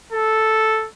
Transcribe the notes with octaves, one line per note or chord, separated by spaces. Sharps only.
A4